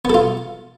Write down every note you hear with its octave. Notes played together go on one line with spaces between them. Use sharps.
B3 F4 A4